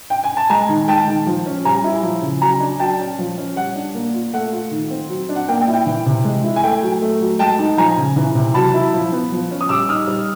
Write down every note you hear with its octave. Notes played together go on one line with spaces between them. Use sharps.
G5
G#5
A5
G#3 G#5 A#5
D#3
G#3 G5 A5
D#3
F3
C#4
G3 G#5 A#5
E4
F3
C#3
F#3 G#5 A#5
D4
F#3 G5 A5
C#4
F3
C#4
G3 F#5
D4
A#3
F4
A3 F#5
F4
D#3
C4
F#3
D4
F#5
A#3 G5
G5
E4
G5
E3
C3
G#3
E4
G#5
A3 G5
F#3
A3
F#3
G#3 G5 A5
D#4
F3 G#5 A#5
C#3
E3
C3
F#3 A5 B5
E4
F3
B3
F3
C#4
D#6
G3 D6 E6
D#4 D#6 F6
G3